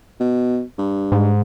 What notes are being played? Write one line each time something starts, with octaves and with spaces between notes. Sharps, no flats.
B2
G2
G#2